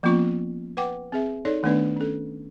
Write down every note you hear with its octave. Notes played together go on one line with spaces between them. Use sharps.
F3 A#3 B3 C#4 F4 C#6
B4 F#5 G5 D6
C4 G#4 E5
D#4 A4 C#5 D5
D#3 A3 B3 D4 B4 D5
C#4 A4